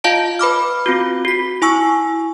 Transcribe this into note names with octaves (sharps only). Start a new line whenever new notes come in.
F4 D#5 F5 A5 D7
B4 B5 D6 F6
C4 F4 F#4
F#4 B6
E4 G#5 C#6 E6